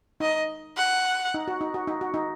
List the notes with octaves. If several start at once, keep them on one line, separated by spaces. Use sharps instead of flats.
D#4 D#5
F#5
D#4
F#4
D#4
F#4
D#4
F#4
D#4